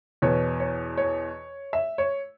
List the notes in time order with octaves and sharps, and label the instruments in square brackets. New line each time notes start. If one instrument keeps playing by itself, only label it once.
[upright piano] E2 B2 C#5
C#5
C#5
E5
C#5